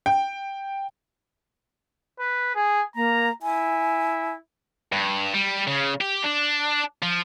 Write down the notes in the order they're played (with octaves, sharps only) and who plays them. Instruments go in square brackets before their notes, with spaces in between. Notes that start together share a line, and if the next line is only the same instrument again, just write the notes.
[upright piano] G5
[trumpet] B4
G#4
[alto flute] A#3 [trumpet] A#5
[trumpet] E4 [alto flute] G#5
[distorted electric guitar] G2
G3
C#3
G4
D4
F3